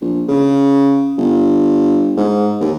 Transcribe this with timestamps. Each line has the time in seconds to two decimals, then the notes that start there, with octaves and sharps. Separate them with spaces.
0.01 A#1
0.28 C#3
1.18 G1
2.17 G#2
2.61 D#2